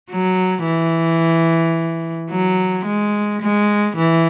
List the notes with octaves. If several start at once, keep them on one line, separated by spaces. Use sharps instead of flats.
F#3
E3
F#3
G#3
G#3
E3